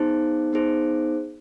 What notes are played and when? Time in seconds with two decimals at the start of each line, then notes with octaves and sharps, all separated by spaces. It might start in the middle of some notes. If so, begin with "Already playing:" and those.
Already playing: B3 D#4 G#4 C5
0.53 B3 D#4 G#4 C5